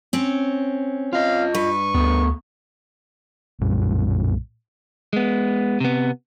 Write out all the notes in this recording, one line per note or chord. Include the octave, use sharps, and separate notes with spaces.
C4 C#4
F4 D#5 F5
G2 B4 C#6
D2 A3 B3
B1 F#2 A#2 G3
G#3 B3
C3 B3